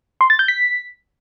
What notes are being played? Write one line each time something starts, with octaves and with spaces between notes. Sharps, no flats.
C6
A6
G6
B6